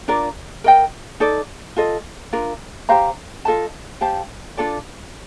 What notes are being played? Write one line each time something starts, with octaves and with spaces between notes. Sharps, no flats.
D4 F4 A#4 D5
A#4 D#5 G5
D#4 A4 D5
F4 A4 D#5
D4 F4 A#4
G4 C5 F5 A#5
F4 A4 D#5 A5
G4 C5 F5 A5
D4 F4 A4 D5